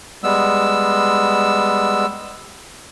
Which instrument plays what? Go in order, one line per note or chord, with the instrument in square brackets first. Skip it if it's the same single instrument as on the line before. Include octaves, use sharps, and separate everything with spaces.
[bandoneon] G3 G#3 B3 E6